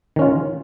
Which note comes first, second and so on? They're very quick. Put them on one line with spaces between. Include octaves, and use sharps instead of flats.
D#3 C#4 F4